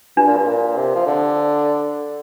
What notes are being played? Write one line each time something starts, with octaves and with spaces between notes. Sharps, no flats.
G2 D4
A#2
G2
A#2
C3
F3
D3